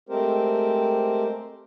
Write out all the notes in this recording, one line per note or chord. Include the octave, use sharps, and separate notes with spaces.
G#3 A3 C4 G4 A#4 C5